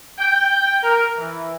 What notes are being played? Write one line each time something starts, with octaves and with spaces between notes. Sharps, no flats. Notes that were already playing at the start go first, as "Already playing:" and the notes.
G5
A#4
E3